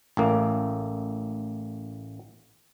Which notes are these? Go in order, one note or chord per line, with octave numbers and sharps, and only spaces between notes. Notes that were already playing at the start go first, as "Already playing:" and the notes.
A1 A2 A#3